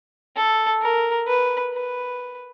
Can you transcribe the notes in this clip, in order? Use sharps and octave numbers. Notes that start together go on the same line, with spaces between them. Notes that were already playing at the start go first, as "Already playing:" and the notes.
A4
A#4
B4
B4